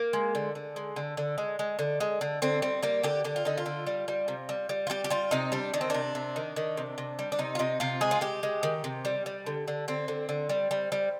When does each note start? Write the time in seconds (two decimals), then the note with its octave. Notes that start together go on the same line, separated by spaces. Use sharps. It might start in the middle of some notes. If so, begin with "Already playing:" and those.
Already playing: A#3
0.13 G#3
0.35 D3
0.55 D3
0.76 G#3
0.96 D3
1.17 D3
1.38 G#3
1.59 G#3
1.79 D3
2.00 G#3
2.21 D3
2.42 D3 C4
2.62 G3 C4
2.83 G3 A#3
3.03 D3 G4
3.24 D3 G4
3.36 F4
3.45 D3 D#4
3.58 F4
3.66 D3
3.86 G3
4.08 G3
4.28 C3
4.49 G3
4.69 G3
4.87 F4
4.90 G3 G4
5.04 G4
5.10 G3 F4
5.31 C3 D#4
5.52 G3 D4
5.74 D#3 D4
5.81 C4
5.90 C3 D4
6.15 C3
6.36 D#3
6.56 D#3
6.77 C3
6.98 C3
7.19 G3
7.32 D4
7.39 C3 D#4
7.55 F4
7.59 C3 D#4
7.80 C3 F4
8.01 G#3 G#4
8.11 F4
8.21 G#3 G4
8.43 G#3
8.63 D#3
8.84 C3
9.05 G3
9.26 G3
9.46 D3
9.68 D3
9.88 D3 C4
10.08 D3
10.29 D3
10.49 G3
10.71 G3
10.92 G3